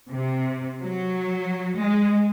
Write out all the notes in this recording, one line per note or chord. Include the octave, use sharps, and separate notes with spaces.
C3
F#3
G#3